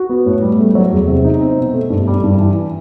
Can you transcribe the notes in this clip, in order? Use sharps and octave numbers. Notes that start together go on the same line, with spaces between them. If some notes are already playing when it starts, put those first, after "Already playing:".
Already playing: F#4
B3
A2
G3
A3
F#3
E2
C3
D#4
C4
B2
A3
G2
G3
G2
E3